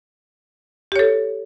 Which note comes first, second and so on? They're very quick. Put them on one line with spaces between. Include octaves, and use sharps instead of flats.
G4 C#5 A4